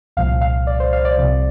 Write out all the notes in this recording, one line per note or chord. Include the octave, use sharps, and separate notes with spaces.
C2 A#2 F3 F5
F5
D5
C5
F5
D5
C2 C3 F3